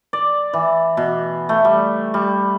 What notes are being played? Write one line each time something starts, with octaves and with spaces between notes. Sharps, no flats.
D5
E3
B2
A3
G3
G3